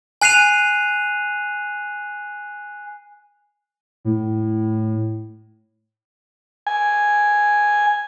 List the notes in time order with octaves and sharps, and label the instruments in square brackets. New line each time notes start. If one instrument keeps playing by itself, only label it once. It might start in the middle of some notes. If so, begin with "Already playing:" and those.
[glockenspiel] G#5 F#6 C7 D#7 F7
[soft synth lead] A2
[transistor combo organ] G#5